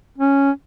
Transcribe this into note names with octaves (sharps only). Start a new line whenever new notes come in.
C#4